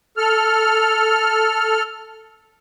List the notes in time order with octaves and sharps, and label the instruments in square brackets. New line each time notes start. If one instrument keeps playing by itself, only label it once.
[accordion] A4 F6